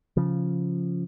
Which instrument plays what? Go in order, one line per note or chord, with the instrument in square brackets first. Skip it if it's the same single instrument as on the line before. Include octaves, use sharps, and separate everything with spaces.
[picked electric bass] C#3 F3